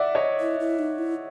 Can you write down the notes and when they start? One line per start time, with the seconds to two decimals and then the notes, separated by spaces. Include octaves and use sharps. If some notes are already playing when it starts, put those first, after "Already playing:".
Already playing: D5 E5 F#5
0.15 C#5 D#5
0.41 E4
0.60 E4
0.79 D#4
0.98 E4